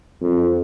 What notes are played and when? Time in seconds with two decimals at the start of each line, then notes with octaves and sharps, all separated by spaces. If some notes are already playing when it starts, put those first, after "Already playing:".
0.22 F2